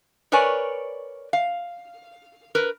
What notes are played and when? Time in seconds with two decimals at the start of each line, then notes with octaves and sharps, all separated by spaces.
0.32 A#4 B4 C#5 D5 G#5
1.33 F5
2.55 A#4 B4